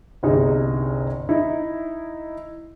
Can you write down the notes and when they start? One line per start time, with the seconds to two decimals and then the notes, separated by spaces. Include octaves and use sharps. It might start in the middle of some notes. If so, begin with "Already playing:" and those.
0.23 G1 C2 D#4 G#4
1.29 D#4 E4